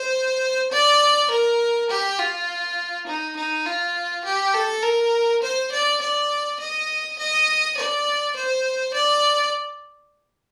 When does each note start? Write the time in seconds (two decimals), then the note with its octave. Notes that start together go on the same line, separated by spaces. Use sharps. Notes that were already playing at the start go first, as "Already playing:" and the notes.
Already playing: C5
0.72 D5
1.30 A#4
1.90 G4
2.19 F4
3.07 D#4
3.36 D#4
3.66 F4
4.25 G4
4.54 A4
4.83 A#4
5.42 C5
5.72 D5
6.01 D5
6.60 D#5
7.18 D#5
7.77 D5
8.36 C5
8.94 D5